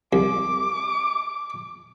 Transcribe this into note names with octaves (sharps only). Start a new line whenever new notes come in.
C2 D6